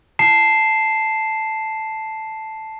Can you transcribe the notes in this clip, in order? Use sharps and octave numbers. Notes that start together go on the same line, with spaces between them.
A5 C7 E7